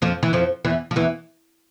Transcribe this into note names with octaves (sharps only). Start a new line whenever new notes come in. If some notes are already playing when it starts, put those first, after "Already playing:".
F2 F3
E3
F2 F3
E2 E3
F3
E2 E3